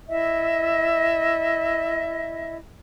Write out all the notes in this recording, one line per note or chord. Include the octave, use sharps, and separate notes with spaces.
E4 D#5 E5